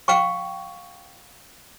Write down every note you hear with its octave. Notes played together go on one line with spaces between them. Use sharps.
F5 G5 C#6